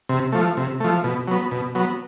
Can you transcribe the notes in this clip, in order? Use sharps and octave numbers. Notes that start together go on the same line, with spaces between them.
C3
F3 A3
C3
F3 A3
B2
F#3 B3
B2
F#3 B3